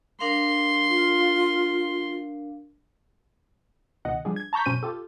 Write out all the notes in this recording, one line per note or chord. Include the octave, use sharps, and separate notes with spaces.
D4 A#4 F5 C6
F4
C#2 B2 D#3 D#5 F#5
F3 G3 D4 G#4
G#6
A5 A#5 C#6 G6 B6
F#2 B2 C#4 C5 D#7
F4 G4 A4